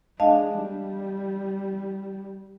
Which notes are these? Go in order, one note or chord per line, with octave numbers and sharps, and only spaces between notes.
G#3 D4 D#5 F5 A5
G3